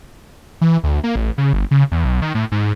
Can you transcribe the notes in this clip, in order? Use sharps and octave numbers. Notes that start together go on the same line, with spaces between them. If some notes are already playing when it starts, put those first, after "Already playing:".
E3
D2
A#3
A1
C#3
G1
C#3
E2
B1
D#3
A2
G#2